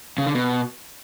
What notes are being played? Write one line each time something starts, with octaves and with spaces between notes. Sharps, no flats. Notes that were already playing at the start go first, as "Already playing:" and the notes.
C#3
D3
B2